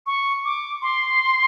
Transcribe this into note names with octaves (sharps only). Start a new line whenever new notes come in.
C#6
D6
C6